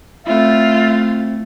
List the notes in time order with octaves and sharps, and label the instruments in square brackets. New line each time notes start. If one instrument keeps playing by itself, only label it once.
[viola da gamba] A3 [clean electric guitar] C4 E4 [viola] F4 [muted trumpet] E5